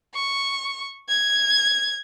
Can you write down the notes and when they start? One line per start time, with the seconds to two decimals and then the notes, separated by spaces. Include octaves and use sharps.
0.14 C#6
1.09 G#6